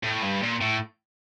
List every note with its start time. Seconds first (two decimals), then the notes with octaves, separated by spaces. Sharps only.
0.04 A2
0.23 G2
0.43 A#2
0.61 A2